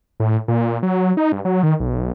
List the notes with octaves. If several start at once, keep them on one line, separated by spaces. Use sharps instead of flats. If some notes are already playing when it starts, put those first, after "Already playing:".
A2
A#2
F#3
D#4
G2
F#3
D#3
B1